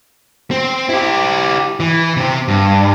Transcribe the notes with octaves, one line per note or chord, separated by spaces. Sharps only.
C4
E4 G4
E3
C3 C4
G2